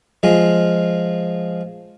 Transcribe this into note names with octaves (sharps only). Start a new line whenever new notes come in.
F3 G#3 F4